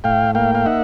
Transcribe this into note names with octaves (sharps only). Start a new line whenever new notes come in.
A2 F5 G5
A#3 F5 G5
F5
D#4 E5 F#5